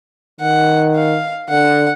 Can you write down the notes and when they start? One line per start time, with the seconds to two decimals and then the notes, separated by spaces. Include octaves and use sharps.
0.40 D#3 F#5
0.95 F5
1.50 D3 F#5